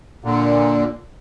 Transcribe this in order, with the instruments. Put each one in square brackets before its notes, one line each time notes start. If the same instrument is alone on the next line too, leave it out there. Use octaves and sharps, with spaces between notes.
[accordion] A#2 D3